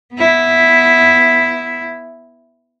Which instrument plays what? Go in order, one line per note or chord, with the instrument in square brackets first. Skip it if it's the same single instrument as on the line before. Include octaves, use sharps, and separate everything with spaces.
[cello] B3 E4